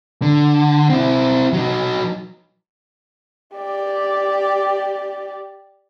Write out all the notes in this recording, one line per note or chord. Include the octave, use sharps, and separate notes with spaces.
D3
C4 E4
F#3 D#4
G4 D5